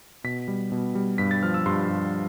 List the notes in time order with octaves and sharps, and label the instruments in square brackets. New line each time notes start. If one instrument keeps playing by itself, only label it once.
[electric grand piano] B2 B6
G3
B2
G3
G2 B6
A6
F3 F6
E6
G2 C6
G2